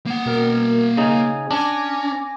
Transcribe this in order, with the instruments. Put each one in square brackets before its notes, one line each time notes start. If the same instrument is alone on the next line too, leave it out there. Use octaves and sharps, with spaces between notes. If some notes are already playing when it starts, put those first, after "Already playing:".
[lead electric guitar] A#3 F#5
[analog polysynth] B2 A#4
[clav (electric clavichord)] C#3 D#4 [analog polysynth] G#5
[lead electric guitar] C#4 [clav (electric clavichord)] D4 [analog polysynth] G#5 D6 A#6